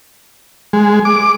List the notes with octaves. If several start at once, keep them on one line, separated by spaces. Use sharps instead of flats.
G#3
D6